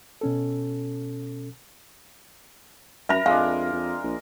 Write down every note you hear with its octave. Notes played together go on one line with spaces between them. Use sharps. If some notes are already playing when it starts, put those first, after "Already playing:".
B2 C#4 A4
F#2 A#4 E5 B5
F2 G#3 D4 F5
F2
A#1